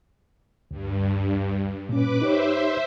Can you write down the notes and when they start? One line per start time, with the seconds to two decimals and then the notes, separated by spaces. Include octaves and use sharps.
0.71 D2 G2
1.89 A#2 C#4 B4 D6
2.22 D#4 G4 C5 C#5 E5